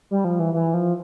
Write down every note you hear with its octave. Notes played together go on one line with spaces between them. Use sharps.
G3
F3
E3
E3
F3